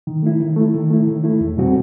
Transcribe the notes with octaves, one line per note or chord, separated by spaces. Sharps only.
D#3
A3 E4
D#3
A3 E4
D#3
A3 E4
D#3
A3 E4
E2
B2 G3 C4 F#4